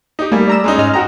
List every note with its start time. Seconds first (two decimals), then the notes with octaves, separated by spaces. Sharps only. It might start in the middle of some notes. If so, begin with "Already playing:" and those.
0.19 D#4 G4
0.32 G3 A3 A#3 G#5
0.47 D5 A#5 E6
0.64 G#3 C#4 D#4
0.78 G#2 D#5 F6
0.94 D#4 F#4 G5 A#5